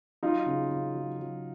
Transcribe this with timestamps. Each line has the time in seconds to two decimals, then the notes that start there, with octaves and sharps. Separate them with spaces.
0.23 F#3 D#4 F4
0.46 C#3
0.71 C#3
0.95 F#3
1.19 F#3